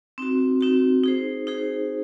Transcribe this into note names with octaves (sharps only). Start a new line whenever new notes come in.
C4 D#4 F#4
C4 D#4 F#4
D#4 G#4 C5
D#4 G#4 C5